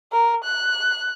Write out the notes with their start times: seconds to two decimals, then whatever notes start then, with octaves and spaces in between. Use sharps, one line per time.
0.12 A#4
0.44 F#6